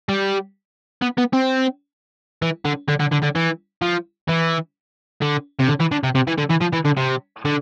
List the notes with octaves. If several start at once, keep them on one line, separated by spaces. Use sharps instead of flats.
G3
B3
B3
C4
E3
D3
D3
D3
D3
D3
E3
F3
E3
D3
C3
D3
E3
D3
C3
C3
E3
D3
E3
F3
E3
D3
C3
D3